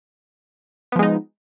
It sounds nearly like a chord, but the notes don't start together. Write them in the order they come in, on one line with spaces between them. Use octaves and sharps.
B3 F3 G#3 D#4